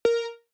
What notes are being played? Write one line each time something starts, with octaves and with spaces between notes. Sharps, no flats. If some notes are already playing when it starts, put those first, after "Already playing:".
A#4